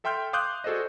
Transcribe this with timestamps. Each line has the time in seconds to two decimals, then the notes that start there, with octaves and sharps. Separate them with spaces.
0.04 A4 E5 G5 C6 F6 G6
0.33 F5 C6 D6 D#6 F#6 G6
0.64 F#4 G#4 A4 C5 D5 D#5